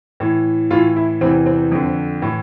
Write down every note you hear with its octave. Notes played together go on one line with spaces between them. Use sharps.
A2 E3
A2 E3 F4
E4
E2 C3 E3 C4
C4
F2 D3
A2 E3